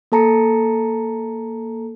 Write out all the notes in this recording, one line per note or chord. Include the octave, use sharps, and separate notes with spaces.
A#3 A4 A5 A#5 C#7